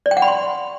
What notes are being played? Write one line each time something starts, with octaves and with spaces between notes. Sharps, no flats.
D5
G5
F#5
B5
C6